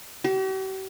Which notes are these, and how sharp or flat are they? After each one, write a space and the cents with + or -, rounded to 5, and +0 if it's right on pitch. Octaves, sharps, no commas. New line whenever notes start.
G4 -45